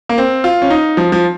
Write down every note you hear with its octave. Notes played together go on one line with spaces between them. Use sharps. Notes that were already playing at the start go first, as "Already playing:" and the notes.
A#3
C4
F4
C#4
D#4
F3
F3